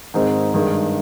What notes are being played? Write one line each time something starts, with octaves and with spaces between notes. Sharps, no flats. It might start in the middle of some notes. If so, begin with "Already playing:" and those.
G#2 D#3 G#3 C4 D#4
G2 D#3 G#3